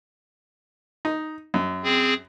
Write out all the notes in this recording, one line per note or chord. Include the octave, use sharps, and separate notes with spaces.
D#4
F#2
C4 G#4